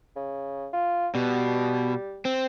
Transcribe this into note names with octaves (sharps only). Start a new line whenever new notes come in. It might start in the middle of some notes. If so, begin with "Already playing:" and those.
C#3
F4
B2 G3
C4